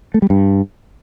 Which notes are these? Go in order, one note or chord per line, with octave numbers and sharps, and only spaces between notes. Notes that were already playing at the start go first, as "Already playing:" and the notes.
A3
G3
G2